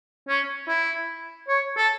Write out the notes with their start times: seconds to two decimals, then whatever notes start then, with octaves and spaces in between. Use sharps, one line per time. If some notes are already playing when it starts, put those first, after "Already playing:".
0.29 C#4
0.68 E4
1.49 C#5
1.77 A4